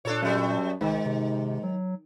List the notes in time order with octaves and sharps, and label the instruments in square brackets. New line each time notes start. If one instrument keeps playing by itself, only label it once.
[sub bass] A#2 [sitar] D4 A4 C#5
[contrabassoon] F#2 [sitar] G3 A3
[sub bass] F1 [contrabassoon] G#2 [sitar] D#3
[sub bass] C3
F#3